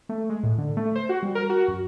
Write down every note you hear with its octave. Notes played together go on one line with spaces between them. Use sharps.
A3
G#3
A2
D3
A3
C5
F#4
G3
A#4
F#4
F#2